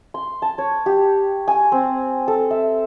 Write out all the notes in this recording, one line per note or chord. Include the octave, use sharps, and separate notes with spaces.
C6
A5
C#5
G4
G#5
C4
A4
E5